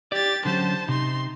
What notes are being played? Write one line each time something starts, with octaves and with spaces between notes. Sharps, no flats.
G4 D5 A6
D3 F#3 C#4 C5 A5
C3 D#4 C6